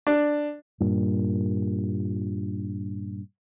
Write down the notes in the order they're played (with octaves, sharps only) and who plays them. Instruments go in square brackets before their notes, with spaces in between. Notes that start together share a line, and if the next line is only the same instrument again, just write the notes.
[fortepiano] D4
[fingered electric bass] G2 A#2